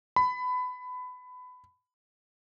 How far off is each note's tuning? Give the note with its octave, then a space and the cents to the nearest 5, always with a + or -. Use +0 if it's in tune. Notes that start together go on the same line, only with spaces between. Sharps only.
B5 +20